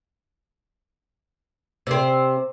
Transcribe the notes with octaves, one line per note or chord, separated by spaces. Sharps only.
C3 C4